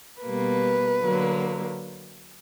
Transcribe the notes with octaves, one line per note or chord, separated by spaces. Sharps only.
B2 G3 A#3 B4
D3 F#3 A#3